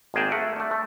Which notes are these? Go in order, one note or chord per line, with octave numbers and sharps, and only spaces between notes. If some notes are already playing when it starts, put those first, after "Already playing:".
G#1 G#3 A#3 G#4 G5 A5
A3 A#4 F#5
A3 D4
A3